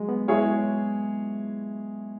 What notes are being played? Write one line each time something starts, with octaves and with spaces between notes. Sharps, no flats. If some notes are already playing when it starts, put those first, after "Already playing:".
Already playing: F#3 G#3
B3
G#3 E4 G#4 C#5